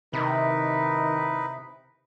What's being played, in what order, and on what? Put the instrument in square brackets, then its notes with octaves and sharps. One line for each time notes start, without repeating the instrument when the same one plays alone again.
[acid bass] C3 [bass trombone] D#3 [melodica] D#4 E4 B4